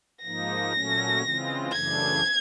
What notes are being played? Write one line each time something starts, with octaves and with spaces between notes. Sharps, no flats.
G#2 F3 A#3 D#4 A#6
A#2 F#3 A3 C#4
C#3 E3 G#3 C4 F4
F#2 C#3 E3 A3 D4 G#6